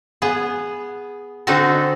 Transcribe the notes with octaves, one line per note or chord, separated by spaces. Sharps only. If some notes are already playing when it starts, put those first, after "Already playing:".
B3 G#4
D3 C4 D#4 F#4 A4